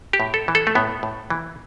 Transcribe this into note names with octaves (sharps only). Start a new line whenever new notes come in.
G4
A2
A4
E3
A4
A3
A2 B3
A2
E3